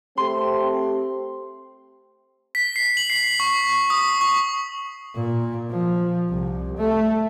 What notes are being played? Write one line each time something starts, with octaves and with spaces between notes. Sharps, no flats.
A3 C4 G4 C6
B6
C7
F#7
C7
C#6
D#6
C#6
A#2
F3
C2
A3